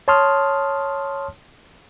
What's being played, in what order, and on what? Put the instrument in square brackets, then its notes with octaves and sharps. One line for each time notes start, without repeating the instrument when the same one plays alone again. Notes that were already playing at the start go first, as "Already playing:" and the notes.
[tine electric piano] C#5 A5 C6 D#6 F6